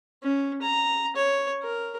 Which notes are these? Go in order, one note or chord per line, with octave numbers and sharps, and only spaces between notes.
C#4
A#5
C#5
A#4